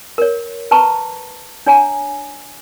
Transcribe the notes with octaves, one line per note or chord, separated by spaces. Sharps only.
A#4 C#5
B4 A5 A#5 C#6
D4 C#5 G#5 A#5